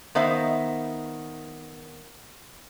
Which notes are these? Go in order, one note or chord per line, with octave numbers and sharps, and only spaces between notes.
D#3 B3 C5 E5 F5